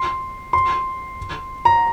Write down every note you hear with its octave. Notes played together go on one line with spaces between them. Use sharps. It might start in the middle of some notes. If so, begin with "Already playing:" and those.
Already playing: C6
C6
A#5